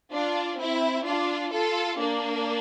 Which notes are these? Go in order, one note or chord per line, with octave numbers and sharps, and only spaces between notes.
D4 F4
C4 E4
D4 F4
F4 A4
A#3 D4